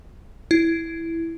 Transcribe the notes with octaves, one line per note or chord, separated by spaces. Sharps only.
E4